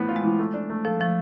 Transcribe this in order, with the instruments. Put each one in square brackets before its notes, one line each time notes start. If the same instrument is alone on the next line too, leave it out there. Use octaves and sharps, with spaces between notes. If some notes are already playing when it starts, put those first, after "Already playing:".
Already playing: [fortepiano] A2 E3 B3
F4
[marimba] G#3
[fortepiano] E3
A3
D4
A3
[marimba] F3 [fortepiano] A4
[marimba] F3 [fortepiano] A3